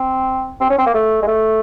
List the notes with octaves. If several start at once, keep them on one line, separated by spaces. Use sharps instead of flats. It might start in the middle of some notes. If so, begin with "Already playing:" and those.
Already playing: C4
C4
C#4
C4
A#3
A3
G#3
A3